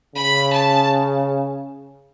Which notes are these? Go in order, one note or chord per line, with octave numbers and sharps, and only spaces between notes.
C#3 B5
A5